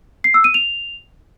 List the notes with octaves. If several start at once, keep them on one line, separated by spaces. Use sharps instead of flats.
C7
E6
D#7
F7